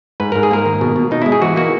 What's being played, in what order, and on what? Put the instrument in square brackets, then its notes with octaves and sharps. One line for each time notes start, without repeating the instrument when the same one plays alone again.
[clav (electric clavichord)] G#2 B4
G#2 A#4
G#4
A#3 A#4
D#3
B2
B2
B2 D#4
G#3 E4
G#4
E3 F#4
A#3 F#4